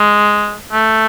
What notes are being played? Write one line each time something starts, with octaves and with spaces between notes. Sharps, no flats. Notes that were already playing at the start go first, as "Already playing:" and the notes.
Already playing: G#3
A3